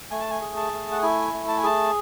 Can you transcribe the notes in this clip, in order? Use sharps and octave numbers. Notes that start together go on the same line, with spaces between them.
A3 G#5
A5
G#5
G#4
A5
A3
F#5
E4 G#5
A3
A5
G#5
G#4 A5